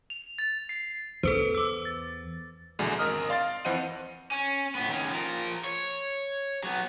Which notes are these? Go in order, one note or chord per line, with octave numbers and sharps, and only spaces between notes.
F7
A6
C7
E2 A4 B4 C5
D6 E6
A6
A#1 E2 B2 D3 G#3
G#1 A#4 D#5 D#6 F6
D5 F5 C6 F6 A6
F2 E3 C5 D#5 F#5 D#7
C#4
A2 B3
D#3 C#4
F3 A#4
C#5
F#3 B3